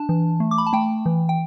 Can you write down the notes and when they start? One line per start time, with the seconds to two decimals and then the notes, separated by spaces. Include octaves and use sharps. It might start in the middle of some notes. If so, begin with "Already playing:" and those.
Already playing: D4 A5
0.09 E3
0.40 A3
0.51 D6
0.58 B5
0.66 A5
0.73 A3 G5
1.06 E3
1.29 G5